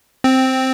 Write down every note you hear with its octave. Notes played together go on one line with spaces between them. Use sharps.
C4